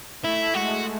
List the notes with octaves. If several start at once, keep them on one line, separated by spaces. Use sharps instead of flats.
A3 E4
G#3 F#4